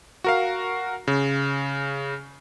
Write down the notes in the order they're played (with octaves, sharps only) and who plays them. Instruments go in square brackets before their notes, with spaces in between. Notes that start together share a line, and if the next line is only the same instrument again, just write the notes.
[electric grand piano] F#4 A#4 F5
C#3